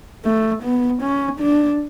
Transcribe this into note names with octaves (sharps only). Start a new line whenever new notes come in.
A3
B3
C#4
D4